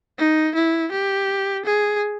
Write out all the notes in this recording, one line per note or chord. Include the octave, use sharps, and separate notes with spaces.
D#4
E4
G4
G#4